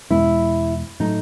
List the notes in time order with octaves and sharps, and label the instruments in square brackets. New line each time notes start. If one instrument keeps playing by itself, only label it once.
[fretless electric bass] E2 B2 G#3 B3 [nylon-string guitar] E4
[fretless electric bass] A2 F#3 A3 [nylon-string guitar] D#4